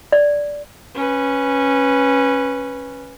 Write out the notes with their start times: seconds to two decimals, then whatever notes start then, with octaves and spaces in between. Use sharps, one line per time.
0.12 D5
0.95 C#4 B4